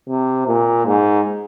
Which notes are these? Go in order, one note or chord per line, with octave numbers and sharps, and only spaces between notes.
C3
A#2
G#2